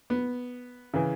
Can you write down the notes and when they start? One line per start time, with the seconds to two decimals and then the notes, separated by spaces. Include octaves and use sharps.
0.10 B3
0.94 C#3 E3